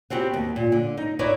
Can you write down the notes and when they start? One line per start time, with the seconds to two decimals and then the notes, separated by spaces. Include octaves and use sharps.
0.10 B3 C4 F#4 G4
0.33 D#2
0.56 A#2
0.72 D3
0.97 D#4
1.19 D#4 E4 B4 C#5 D5 E5